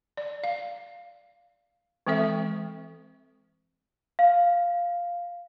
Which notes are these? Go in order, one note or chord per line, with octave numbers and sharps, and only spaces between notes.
D5
F5
E3 G#3 C4 A4 E5
F5